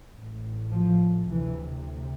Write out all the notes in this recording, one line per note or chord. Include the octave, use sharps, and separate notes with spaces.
A1 A2
F3
D2 C3 E3